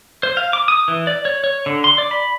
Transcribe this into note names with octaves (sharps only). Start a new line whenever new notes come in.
C5
F5
D6
D#6
E3
D5
C#5
C#5
D3
C6
D5
B5